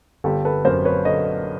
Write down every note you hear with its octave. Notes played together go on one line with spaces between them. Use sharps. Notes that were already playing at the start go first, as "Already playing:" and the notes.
G1 G4 A4
A4 B4
F#2 A#4 C5
B4 C#5
D3 C#5 D#5